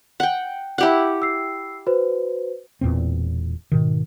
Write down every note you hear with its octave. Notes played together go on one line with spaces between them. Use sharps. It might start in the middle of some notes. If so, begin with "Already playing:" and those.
F#5 G5
E4 G4 F#5
E6 C7
F#4 B4 C5
E1 E2 A#2 C4
G#2 B2 D#3